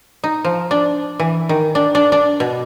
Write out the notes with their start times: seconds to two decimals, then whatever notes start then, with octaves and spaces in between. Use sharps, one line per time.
0.24 D#4
0.45 F3
0.71 D4
1.20 E3
1.49 D#3
1.75 D4
1.95 D4
2.12 D4
2.40 B2